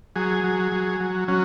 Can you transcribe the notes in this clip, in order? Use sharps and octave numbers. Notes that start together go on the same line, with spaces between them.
F#3 G#4
F#3
F#3
F#3
F#3 C#4